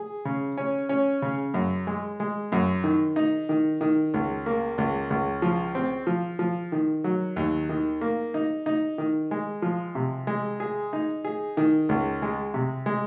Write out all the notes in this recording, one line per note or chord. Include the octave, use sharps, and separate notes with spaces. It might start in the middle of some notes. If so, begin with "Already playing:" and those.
Already playing: G#4
C#3
C#4
C#4
C#3
F#2
G#3
G#3
F#2
D#3
D#4
D#3
D#3
C#2
A#3
C#2
C#2
F3
C4
F3
F3
D#3
F#3
D#2
D#3
A#3
D#4
D#4
D#3
G#3
F3
C3
G#3
G#4
D#4
G#4
D#3
C#2
G#3
C3
G#3